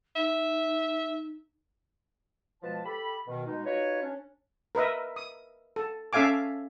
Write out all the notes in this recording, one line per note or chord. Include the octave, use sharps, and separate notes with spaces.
D#4 E5
B2 F3 G#3 B4 A5
G4 A4 B5
B2 D#3
B2 G#3 D#4
D#4 F4 F#4 B4 C#5
C#4 D4
A#4 B4 D#5 E5
D#6
A4
C#4 A4 E5 F5 G#5 D6